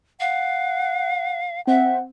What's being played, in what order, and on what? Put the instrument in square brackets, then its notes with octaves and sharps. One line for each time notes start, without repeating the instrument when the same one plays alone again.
[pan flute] F5 [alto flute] F#5
[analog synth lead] C4 [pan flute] E5 [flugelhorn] F#5